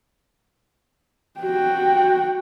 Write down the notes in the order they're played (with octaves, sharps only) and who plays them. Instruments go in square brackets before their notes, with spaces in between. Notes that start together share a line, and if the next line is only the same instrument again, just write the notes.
[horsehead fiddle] F#4 G5